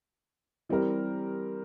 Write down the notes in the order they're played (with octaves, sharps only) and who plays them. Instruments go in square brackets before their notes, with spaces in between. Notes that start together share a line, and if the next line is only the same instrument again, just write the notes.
[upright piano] E3 G3 C4 G4 A#4